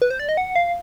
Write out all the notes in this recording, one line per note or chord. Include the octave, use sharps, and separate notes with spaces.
B4
C5
D5
D#5
F#5
F5